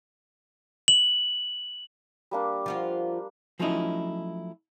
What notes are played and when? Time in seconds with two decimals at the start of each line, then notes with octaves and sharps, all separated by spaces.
0.88 F#7
2.31 G3 A#3 D4
2.66 F3 F4 F#4
3.59 F3 F#3 A3 C#4 D#4 E4